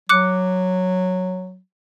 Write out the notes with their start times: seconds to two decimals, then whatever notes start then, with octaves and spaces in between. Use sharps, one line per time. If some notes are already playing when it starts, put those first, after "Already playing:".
0.09 F#3 D6 F#6 C#7